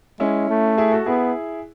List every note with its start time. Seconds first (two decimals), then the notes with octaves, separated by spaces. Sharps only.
0.20 G#3 C#4 E4
0.49 A3
0.78 E4 G#4
0.91 F#4 A4
1.06 B3 E4 G#4